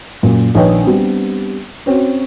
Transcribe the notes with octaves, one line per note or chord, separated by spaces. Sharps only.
F#2 A#2
A#1 D#3 B4 C#5 D#5 G5
G3 B3 C4 D4
C4 C#4 F#4